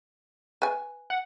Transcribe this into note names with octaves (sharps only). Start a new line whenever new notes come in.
B4 G#5
F#5